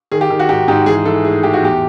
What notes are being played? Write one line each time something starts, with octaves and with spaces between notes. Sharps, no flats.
D#3 G#4
G4
D#3
F#4
G#2 G4
G#2 G4
E3 G#4
E3 A4
A2 G#4
A2 G4
F#4
E2 G4